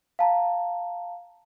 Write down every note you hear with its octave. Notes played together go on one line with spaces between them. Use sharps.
F5 A5 A#5